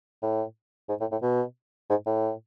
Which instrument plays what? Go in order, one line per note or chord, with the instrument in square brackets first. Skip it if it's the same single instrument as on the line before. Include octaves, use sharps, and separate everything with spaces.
[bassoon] A2
G#2
A2
A2
B2
G#2
A2